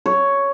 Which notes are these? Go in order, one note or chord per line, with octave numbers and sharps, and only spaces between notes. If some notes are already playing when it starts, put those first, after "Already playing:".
C#5